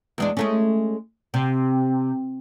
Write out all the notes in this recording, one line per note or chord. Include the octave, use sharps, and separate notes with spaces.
E2 G#3 D4
G#3 A3 C#4
C3